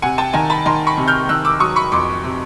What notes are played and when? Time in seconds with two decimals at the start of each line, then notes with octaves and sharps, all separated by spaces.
0.02 C3 F#5 G#5
0.18 G5 A5
0.33 D#3 G#5 A#5
0.50 A5 B5
0.65 D#3 A#5 C6
0.87 B5 C#6
0.97 C3
1.08 F6 G6
1.29 D#3 E6 F#6
1.45 D6 E6
1.60 F#3 C#6 D#6
1.76 B5 C#6
1.92 F2 C6 D6
2.24 C3